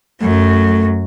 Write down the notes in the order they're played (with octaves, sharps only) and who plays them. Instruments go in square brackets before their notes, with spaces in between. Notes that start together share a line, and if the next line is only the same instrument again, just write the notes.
[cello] F#2 F#3 [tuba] A3